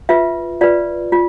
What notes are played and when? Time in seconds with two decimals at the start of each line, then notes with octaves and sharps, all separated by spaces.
0.09 F4 B4 E5
0.61 F4 B4 D5
1.12 F4